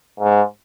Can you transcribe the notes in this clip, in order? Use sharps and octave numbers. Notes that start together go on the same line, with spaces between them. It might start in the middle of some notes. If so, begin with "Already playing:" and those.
G#2